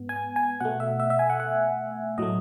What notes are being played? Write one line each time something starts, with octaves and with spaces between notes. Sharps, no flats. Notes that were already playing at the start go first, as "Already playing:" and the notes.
Already playing: G#2 B3
G#5
G#5
B2 A3 F#5
E5
E5
E5
G#5
F#5
F#5
A2 F#3 A3 D#5